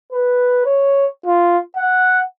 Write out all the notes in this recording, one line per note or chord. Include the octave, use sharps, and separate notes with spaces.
B4
C#5
F4
F#5